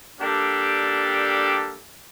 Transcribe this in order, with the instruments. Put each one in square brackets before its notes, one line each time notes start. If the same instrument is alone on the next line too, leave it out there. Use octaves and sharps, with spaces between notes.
[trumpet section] G3 A#3 D4 G4 A4